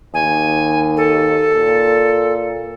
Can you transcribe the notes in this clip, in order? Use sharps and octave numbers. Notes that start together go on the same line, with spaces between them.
D#2 G#5
A4
A#2